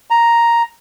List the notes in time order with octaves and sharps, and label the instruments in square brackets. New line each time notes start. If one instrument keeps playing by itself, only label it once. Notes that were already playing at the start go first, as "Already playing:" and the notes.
[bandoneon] A#5